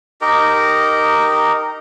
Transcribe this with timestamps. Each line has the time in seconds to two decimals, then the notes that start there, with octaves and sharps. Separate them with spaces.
0.21 D#4 G4 A#4 D#5